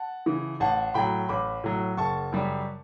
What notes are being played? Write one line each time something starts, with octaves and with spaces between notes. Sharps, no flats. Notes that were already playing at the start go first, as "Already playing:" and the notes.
Already playing: F#5 A5
C#3 E3
A1 F#5 A5
A2 F#3 G5 B5
A1 B5 D6
A2 F#3
F#1 A5 C#6
F#2 C#3 G3